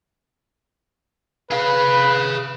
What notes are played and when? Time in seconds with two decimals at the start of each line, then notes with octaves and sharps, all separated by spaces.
1.51 G#4 B4 F5